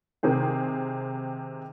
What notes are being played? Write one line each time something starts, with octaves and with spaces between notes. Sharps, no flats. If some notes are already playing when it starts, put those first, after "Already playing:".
C3 D#3 G#4 C5